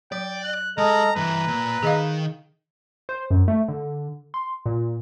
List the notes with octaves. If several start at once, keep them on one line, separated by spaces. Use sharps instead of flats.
F#3 D5 G5
F#6
G#3 A4 D#5 A#5 F6
G2 E3 B4 A#5
A#2
D#3 G#4 D#5 F5
C5
F#2
A3
D3
C6
A#2